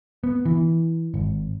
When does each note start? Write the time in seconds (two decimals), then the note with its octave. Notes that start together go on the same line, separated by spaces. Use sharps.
0.24 B3
0.45 E3
1.14 G#1